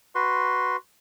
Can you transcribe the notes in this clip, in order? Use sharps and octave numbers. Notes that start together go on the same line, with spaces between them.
F#4 B4 C6